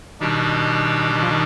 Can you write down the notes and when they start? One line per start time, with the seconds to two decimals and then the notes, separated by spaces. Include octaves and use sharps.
0.21 B2 D#3 G3 D4 G4
1.15 D#3
1.22 F3
1.30 D#3